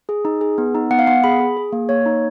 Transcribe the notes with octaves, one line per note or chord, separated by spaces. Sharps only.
G#4
D#4
G#4
B3
D#4
B3 F#5
F5
B3 F#5
G#4 B5
G#4
G#4
A#3
A#3 C#5
D#4